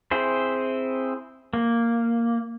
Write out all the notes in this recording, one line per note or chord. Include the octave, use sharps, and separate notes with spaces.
C4 E4 G#4 C5
A#3